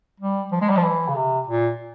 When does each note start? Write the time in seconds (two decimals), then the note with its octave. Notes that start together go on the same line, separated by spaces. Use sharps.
0.20 G3
0.52 F3
0.61 G#3
0.70 G3
0.77 F3
0.83 E3
1.08 C#3
1.16 C3
1.47 A#2